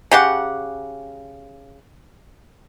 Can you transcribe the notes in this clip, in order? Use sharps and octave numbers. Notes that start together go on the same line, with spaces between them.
C#3 G4 F#5